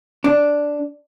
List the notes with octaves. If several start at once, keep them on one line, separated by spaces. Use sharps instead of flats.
D4